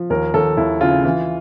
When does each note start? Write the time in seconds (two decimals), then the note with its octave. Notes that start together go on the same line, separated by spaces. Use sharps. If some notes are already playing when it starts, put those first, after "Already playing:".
Already playing: F3
0.10 D#2 A#4
0.34 D#2 A4
0.57 D#2 E4
0.81 C#3 F4
1.04 E3